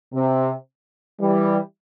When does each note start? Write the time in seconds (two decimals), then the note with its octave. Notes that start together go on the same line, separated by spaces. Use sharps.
0.14 C3
1.21 E3 G3